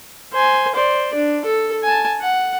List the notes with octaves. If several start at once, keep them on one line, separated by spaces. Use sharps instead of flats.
C5 G#5
C5 D5
D4
A4
G#5 A5
F#5